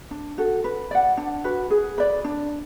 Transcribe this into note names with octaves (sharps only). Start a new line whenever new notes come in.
D4
F#4 A4
B4
D5 F#5
D4
F#4 B4
G#4
B4 D5
D4